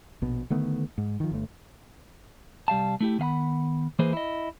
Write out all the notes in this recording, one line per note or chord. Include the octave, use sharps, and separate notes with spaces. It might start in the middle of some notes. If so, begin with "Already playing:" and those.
A#1 B2
D3 D#3 A3 B3
G#2
D#3 F3
G1 A3
C2 G3 F5 A5
A3 E4 G4
D#3 B3 F5 F#5 B5
E3 A#3 E4 G#4 B4 C5
E4 D#5